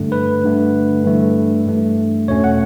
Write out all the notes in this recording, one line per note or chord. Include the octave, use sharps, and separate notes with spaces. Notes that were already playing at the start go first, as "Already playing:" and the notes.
Already playing: G2 D3 A3
B4
G2 D3 A3
G2 E3 A3
G2 E3 A3
E2 B2 A3 C#4 C#5
F#5